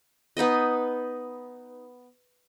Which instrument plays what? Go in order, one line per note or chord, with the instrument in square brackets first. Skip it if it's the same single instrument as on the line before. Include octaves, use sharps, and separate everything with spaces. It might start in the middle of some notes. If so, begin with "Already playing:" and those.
[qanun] B3 D#4 B4 D#5